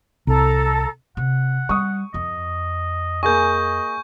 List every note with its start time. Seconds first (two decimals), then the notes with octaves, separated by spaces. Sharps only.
0.27 C2 A4 A#5
1.17 C3 F#5
1.69 G3 C#6 D#6
2.14 F2 D#5
3.23 A#3 G#4 D#5 G#5 C#6 G6